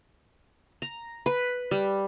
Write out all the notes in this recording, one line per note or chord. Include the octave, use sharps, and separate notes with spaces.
A#5
B4
G3